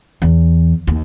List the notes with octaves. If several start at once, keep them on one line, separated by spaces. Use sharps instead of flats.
E2
D#2